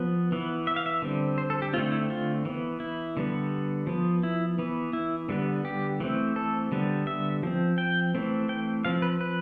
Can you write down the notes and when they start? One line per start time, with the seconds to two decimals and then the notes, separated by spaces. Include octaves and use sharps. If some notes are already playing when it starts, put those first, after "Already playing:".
Already playing: F3 B3
0.32 E3 B3
0.67 E5
0.76 F5
0.86 E5
1.02 D3 G3 C4
1.38 C5
1.50 A4
1.62 G4
1.73 D3 A3 C4 F4
1.92 E4
2.10 F4
2.45 E3 B3
2.80 E4
3.17 D3 G3 B3
3.87 F3 B3
4.23 E4
4.59 E3 B3
4.93 E4
5.29 D3 G3 B3
5.65 G4
6.00 E3 A3 C4
6.36 A4
6.72 D3 G3 B3
7.07 E5
7.43 F3 C4
7.78 G5
8.15 E3 A3 C4
8.49 G5
8.85 F3 C4 F5
9.02 B4
9.21 B4